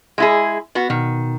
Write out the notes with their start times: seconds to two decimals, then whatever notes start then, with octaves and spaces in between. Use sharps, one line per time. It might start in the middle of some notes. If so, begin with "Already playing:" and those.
0.18 G#3 E4 G#4
0.75 B3 F#4
0.90 B2 D#3